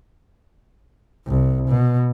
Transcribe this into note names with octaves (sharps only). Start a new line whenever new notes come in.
C2
B2